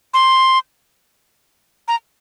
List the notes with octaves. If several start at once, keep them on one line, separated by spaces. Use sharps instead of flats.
C6
A#5